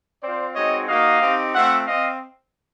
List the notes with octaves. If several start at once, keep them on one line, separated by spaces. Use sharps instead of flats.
C4 F4 C5 D5
G#3 C4 D#4 F#4 C#5 D#5
A#3 D#4 F#4 D#5 F5
C4 D#4 G4
A3 C4 F4 E5 F#5
C4 D#5 F5